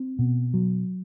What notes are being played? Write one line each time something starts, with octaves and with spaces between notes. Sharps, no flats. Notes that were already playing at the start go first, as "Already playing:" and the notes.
Already playing: C4
B2
F#3